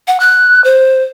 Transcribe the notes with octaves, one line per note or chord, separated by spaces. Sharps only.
F#5
F#6
C5